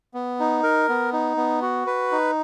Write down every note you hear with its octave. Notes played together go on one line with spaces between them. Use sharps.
B3
D#4
A#4
B3
D#4
B3
F#4
B4
D#4